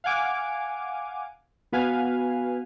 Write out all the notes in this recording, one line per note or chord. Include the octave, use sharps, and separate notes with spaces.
F5 F#5 G#5 D6
B3 F#4 B4 F5 G#5